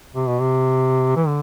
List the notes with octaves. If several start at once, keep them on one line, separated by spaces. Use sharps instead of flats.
C3
B2
C3
E3
D3